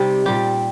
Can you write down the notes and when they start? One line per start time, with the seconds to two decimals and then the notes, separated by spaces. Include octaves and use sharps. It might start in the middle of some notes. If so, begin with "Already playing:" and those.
Already playing: C3 G3 D#4
0.25 A#2 G3 G4